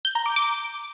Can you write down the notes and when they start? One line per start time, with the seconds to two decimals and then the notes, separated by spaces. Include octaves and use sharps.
0.05 G6
0.15 A#5
0.26 D6
0.36 D6